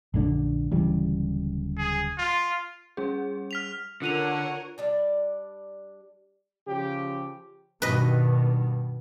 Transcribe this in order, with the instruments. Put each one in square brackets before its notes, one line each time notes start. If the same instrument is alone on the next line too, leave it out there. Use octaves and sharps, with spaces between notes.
[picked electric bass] A#1 D3 [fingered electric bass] F#2 A3 D4
[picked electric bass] D1 C#3 G3 [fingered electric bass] E3
[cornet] G#4
F4
[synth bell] G3 C#4 G#4
[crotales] F6 B6 F7
[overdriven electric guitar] D3 [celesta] F4 D#7 F7 [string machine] A#4 C#5 [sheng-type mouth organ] F#5
[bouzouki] G3 D4 D5
[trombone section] C#3 F3 G4
[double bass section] G2 B2 D#3 [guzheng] B4 D#5